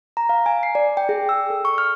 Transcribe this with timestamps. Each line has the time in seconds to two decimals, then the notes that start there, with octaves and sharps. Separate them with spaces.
0.17 A#5
0.29 F5
0.46 G#5
0.63 C7
0.75 D5
0.97 G5
1.09 G#4
1.29 E6
1.50 A4
1.65 C#6
1.78 F6